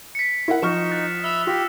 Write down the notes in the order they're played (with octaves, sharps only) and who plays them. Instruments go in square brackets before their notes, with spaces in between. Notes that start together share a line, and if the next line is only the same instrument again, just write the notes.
[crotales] B6 C#7
[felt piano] E4 A#4 F#5
[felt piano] F3 C#6 [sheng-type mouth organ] D#4 [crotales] F6 E7
[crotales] D#6 F#6 A6
[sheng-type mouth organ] E5 B5 [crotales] E6 F7
[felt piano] F4 [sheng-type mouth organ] G4 [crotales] A#6 B6